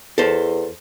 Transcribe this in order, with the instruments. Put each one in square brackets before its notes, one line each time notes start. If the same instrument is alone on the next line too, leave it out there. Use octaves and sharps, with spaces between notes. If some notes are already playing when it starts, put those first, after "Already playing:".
[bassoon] E2 [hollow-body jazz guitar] A4 C5